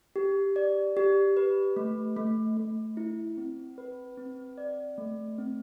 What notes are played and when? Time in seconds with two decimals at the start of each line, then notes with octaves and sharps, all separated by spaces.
0.16 G4
0.56 D5
0.97 G4
1.37 B4
1.76 A3
2.16 A3
2.57 A3
2.97 E4
3.37 C4
3.78 B4
4.17 C4
4.58 D5
4.98 A3
5.38 C4